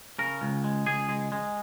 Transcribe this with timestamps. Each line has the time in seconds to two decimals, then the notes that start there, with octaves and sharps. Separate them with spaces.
0.19 C#3 A#4
0.42 C#2
0.64 G#3
0.86 C#2 G#4
1.09 G#3
1.32 G#3